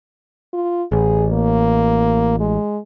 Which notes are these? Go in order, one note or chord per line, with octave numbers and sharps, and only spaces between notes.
F4
A1 G#4
A#3
G#3